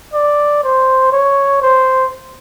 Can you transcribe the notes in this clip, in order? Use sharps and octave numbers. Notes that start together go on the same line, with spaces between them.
D5
C5
C#5
C5